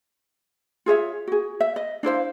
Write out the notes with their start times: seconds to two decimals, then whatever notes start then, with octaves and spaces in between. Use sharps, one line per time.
0.86 F4 G#4 C#5 E5
1.27 F#4 G#4
1.60 E5
1.76 D#5
2.03 D4 E4 C5 F5